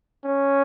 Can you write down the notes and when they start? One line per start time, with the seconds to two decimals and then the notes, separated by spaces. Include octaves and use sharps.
0.25 C#4